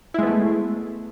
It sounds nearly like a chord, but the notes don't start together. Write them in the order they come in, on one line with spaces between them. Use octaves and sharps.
E4 G#3 B3 A3